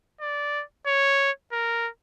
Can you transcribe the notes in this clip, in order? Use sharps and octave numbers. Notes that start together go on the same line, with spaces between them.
D5
C#5
A#4